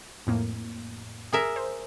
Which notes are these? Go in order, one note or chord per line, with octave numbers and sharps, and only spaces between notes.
F2 A2 A#3
G#4 A#4 E5
C5